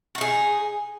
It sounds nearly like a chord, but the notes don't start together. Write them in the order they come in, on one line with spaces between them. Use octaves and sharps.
F#4 D#4 G#4